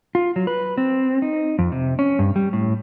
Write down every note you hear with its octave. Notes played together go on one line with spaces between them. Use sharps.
F4
F#3
B4
C4
D#4
F2
C3
C#4
G2
G3
A2